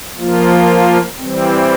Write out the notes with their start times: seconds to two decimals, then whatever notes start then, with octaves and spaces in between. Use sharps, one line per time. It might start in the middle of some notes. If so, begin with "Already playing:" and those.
0.17 F3 A#3 F4
1.18 E3 G3 C4